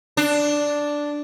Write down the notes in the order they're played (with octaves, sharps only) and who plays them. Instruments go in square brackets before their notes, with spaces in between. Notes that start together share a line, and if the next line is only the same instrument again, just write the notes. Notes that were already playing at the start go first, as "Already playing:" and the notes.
[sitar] D4